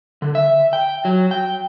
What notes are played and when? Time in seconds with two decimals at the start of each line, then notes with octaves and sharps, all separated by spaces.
0.22 D3
0.35 E5
0.73 G5
1.05 F#3
1.31 G5